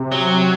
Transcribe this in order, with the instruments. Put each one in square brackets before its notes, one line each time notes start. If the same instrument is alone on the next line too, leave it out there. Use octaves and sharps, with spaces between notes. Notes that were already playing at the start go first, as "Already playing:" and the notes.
Already playing: [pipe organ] C3
[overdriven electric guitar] F#3